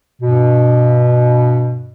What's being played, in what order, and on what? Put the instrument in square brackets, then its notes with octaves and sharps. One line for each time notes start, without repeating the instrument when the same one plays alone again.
[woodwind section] G2 B2